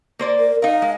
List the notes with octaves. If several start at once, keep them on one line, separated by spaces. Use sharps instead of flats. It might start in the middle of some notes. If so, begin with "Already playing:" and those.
A#3 C5 D5
A#4
D#4 A#4 F5
G#3